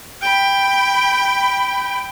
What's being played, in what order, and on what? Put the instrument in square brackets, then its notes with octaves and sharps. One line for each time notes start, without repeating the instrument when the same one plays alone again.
[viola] G5 B5